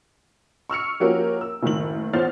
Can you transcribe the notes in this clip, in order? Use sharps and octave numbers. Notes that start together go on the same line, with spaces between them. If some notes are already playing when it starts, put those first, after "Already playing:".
C#6 E6 F6 C#7
F3 A#3 C#4 F#4 G4 A#4
E6
F#1 A2 D#3 F#7
E2 A#2 C5 C#5 F6 A6